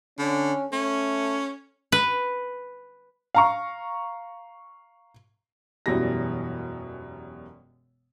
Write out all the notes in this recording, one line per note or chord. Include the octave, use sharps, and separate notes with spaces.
D3 C#4
A3 C#4
B4
F5 A#5 C#6
E1 F#2 B2 E3 G3 A#6